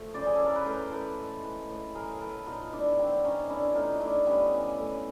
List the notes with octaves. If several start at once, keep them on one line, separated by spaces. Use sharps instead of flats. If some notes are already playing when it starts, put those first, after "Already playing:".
Already playing: F3 A3
C#3 C5 D5
G#4
E3 A4
A#4
B4
A2 A#4 C5
A2 A4 B4
G#3
E3
A2
F#3 G#4 A#4
B2 A4 B4
B2 D#4 F4
A3 D4 E4
F#3 C4 D4
B2 C#4 D#4
E3 D4 E4
A2 D#4 F4
A2 D4 E4
G3 B3 C#4
E3
A2